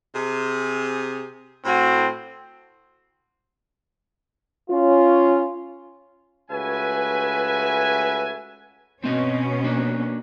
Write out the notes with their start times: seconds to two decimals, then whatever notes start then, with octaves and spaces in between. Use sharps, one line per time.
0.14 C3 G#4
1.65 A2 C4 F#4
4.71 C#4 F4
6.50 C#2 A3 F#4 B4 E5 G#5
9.04 B2 C4 C#4 D#5
9.64 A#3 D4